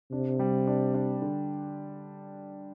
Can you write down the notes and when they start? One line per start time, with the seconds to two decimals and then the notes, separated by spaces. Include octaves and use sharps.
0.12 C3 D4
0.39 G3
0.67 D4
0.94 D4
1.22 D3